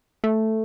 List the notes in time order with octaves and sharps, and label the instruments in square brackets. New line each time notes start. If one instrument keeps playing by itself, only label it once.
[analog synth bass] A3